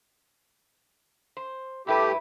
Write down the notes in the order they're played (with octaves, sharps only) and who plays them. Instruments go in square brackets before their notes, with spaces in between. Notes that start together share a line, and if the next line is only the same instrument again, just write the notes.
[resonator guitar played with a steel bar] C5
[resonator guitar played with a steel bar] G2 E4 B4 [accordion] A3 G4